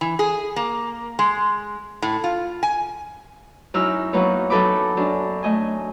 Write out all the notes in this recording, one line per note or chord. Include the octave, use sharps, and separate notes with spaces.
E3
G#4
A#3
G#3
A2
F4
G#5
F#2 D#4 E4 E6 F6
F#3 A#3 B3 D#4 B4 C#5
F#3 D#4 A4 B4 B5 D6
F#2 D4
A3 D#5 G#5